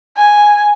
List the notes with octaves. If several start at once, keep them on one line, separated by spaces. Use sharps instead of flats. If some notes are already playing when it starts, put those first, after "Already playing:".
G#5